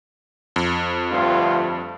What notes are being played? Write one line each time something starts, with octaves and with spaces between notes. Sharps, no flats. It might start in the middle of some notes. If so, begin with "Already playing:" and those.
F2
D2 G2 F4